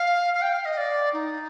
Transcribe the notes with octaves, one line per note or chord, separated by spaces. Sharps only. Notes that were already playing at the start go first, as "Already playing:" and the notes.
Already playing: F5
F5
G5
F5
D#5
D5
D#4